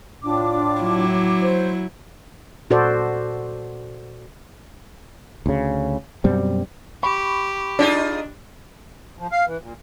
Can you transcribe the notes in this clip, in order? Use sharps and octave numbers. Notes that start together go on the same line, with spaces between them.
A2 D4 F4 D6
F#3 E4
C5
A#2 F#4 A4 C5 D5
D2 C#3
F#2 B2 G3 C4
G4 B5 C#6
D4 D#4 F4 G#4
F3
F5
E3
A#2